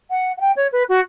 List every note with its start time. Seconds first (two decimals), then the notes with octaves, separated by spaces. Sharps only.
0.10 F#5
0.37 F#5
0.40 G5
0.56 C#5
0.72 B4
0.89 F#4